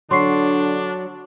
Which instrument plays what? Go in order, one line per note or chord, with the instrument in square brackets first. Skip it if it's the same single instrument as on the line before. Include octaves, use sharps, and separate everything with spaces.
[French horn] D3 [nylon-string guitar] F#3 [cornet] D4 [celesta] C6 C#6 C7